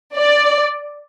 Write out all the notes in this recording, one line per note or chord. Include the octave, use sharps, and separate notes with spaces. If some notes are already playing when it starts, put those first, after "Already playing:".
D5